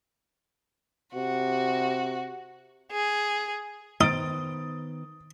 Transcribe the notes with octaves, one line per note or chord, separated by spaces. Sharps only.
C3 F#4
G#4
D#3 B3 D#4 C5 D#6 A6 D7